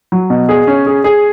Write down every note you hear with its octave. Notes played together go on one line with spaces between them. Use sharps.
F#3
B2
G#4
C#4
G#4
G#4